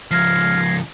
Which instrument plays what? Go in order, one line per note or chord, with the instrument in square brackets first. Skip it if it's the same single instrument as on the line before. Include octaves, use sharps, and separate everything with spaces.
[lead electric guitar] C#2 F3 [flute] F6 [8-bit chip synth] G#6 A#6 C7